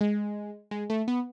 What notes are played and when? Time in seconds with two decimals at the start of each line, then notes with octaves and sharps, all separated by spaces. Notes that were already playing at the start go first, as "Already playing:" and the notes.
0.01 G#3
0.71 G#3
0.90 A3
1.08 B3